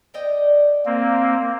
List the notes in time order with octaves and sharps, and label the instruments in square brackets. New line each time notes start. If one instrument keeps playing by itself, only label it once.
[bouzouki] D5 D#5 G5
[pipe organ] A#3 C4